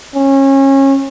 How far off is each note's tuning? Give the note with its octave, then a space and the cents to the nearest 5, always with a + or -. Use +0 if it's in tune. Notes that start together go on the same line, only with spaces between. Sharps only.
C#4 -25